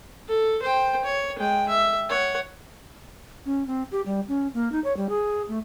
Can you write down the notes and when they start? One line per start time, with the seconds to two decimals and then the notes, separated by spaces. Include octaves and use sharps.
0.28 A4
0.62 C5 G5
1.05 C#5
1.39 G#3 G5
1.69 E5
2.10 C#5 F#5
3.46 C#4
3.67 C4
3.92 G4
4.06 G3
4.28 C#4
4.54 A#3
4.72 D#4
4.84 C#5
4.97 G3
5.09 G#4
5.48 A3